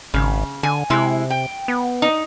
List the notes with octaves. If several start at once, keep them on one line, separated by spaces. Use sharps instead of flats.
G#1 C#3
D3 G#5
C3 G#3 E4
G5
B3
D#4